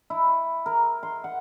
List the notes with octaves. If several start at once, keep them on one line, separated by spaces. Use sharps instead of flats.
E4
A#4
C6
F#5